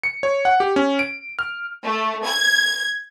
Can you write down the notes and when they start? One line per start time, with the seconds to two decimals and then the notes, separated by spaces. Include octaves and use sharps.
0.03 C#7
0.23 C#5
0.45 F#5
0.60 G4
0.76 C#4
0.99 D7
1.39 F6
1.84 A3
2.25 G#6